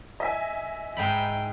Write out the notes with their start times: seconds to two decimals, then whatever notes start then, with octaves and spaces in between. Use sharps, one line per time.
0.20 D#5 E5 G#5
0.97 G#2 D#4 G5 B5